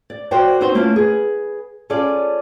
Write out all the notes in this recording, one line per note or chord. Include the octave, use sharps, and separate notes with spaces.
D5
F#4 A#4 C5 D5 F#5 G5
C4 D#4 F#4 B4 C5
A3 A#3 C#4 E4 F4
G#4 B4
C#4 F4 G#4 A4 D5